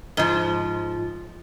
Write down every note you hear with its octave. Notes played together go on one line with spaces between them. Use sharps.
G#2 F3